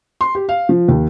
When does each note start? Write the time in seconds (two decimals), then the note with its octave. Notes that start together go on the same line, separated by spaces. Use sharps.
0.21 C6
0.35 G4
0.49 F5
0.69 F3
0.88 D#2